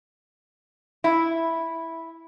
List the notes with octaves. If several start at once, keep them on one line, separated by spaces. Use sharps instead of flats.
E4